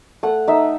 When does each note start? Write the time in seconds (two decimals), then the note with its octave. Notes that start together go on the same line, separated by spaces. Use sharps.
0.23 A3 F#5
0.48 D#4 E5